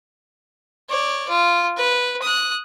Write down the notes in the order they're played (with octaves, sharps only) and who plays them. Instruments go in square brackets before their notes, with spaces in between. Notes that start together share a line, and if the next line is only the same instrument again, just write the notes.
[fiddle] C#5 D5
F4
B4
D#6 F#6